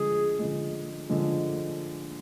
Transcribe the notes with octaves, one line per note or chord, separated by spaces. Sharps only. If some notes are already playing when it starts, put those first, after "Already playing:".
Already playing: D3 F3 G#3 G#4
D3 F3 G#3
D3 F3 G#3